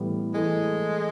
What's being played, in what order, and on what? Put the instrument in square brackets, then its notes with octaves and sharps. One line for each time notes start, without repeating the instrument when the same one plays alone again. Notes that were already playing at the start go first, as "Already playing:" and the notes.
Already playing: [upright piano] A2 E3 G3 B3
[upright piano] E3 A3 [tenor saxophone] G#3